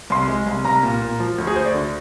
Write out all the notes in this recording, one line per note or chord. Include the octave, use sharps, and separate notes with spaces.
C2 C6
G#3
C2
C2 A#5
A#2
A#2
F3
D2
G#4
D2 C5
D5
D3